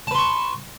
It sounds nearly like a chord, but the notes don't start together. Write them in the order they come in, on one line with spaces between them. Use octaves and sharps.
A5 B4 C6 C#6